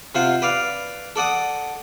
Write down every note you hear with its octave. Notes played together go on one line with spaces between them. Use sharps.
C3 F4 C5 F#5
B4 D5 F5
A4 D5 F#5 D#6